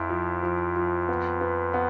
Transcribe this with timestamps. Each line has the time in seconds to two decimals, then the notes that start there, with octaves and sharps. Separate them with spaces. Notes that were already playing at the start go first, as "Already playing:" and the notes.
Already playing: F2 E4
0.10 F3
0.43 F3
0.76 F3
1.09 B3
1.41 B3
1.74 B3